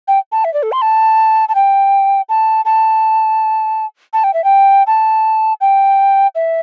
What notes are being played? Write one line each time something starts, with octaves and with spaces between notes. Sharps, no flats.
G5
A5
E5
D5
A4
C6
A5
A5
G5
A5
A5
A5
G5
E5
G5
A5
G5
E5